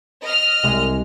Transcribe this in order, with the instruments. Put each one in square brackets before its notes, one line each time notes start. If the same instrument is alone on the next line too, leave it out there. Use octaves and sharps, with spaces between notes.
[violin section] D#5 F6
[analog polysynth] C2 C3 G#3